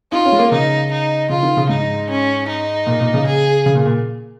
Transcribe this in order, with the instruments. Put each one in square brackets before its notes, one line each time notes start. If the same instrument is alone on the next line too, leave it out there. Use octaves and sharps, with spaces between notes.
[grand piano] D#4 [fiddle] F4
[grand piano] C#4
G#3
A#3
[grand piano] C#3 [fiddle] D#4
[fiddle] D#4
[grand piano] C#3 [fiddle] F4
[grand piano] D#3
C#3
[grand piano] G#2 [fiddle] D#4
[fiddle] C#4
D#4
[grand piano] A#2
A#2
C#3
[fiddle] G#4
[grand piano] C#3
A#2
A#2